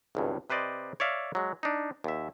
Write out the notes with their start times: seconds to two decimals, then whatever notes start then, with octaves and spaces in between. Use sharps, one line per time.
0.15 G#1 C#2 G2
0.50 C3 B4 C5 D5 D#5
1.00 C#5 D5 E5 F5
1.35 F#3 G#3
1.63 D4 D#4
2.04 D#2 E5